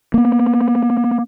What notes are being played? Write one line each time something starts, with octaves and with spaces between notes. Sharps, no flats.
A#3 B3